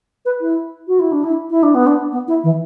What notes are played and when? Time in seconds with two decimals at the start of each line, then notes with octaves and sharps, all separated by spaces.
0.25 B4
0.41 E4
0.87 F#4
0.99 E4
1.12 D4
1.23 E4
1.50 E4
1.63 D4
1.74 B3
1.86 D4
2.12 B3
2.28 E4
2.43 E3